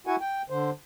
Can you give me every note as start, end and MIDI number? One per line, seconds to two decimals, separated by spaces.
0.07 0.16 64
0.07 0.16 66
0.07 0.16 78
0.07 0.16 80
0.21 0.42 79
0.50 0.71 50
0.50 0.71 72